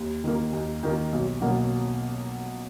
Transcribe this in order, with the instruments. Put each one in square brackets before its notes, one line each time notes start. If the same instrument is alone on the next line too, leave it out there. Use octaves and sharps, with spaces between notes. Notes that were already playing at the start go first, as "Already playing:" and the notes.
Already playing: [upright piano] D#2
D#3 A#3
D#2
D#3 A#3
B1
B2 F#3 A#3